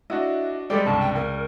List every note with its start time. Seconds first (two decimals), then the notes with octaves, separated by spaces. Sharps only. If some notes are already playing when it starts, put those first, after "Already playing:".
0.10 D4 E4 F#4 D#5
0.70 G3 G#3 G4 A4 D5
0.85 C#2 G2 C3 A5
1.00 G5
1.15 C#2 A#4